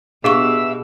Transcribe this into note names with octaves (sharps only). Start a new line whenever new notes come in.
B2 D4 G4 G#4 E5 F5 C#6 E6